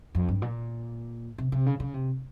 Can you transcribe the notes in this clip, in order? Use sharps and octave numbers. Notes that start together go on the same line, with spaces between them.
F2
G2
A#2
C3
C3
C#3
C#3
C3